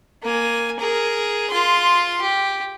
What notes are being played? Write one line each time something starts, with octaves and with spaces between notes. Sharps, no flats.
A#3 G#5
G#4 A#4
F4 C6
G4